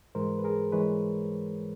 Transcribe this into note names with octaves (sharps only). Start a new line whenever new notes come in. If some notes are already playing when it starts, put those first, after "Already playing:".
G#2 E3 G#3 A#4 C5
B4
G#4 A#4
E3 G#3 B4 C#5